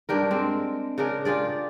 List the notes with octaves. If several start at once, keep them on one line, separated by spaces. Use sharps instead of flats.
G2 D4 G4 A#4
G#3 C4
C#3 D4 G#4 A#4
F4 G4 G#4 D5